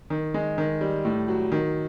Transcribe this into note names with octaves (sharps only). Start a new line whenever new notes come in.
D#3
G#3
D#3
G3
A2
F#3
D#3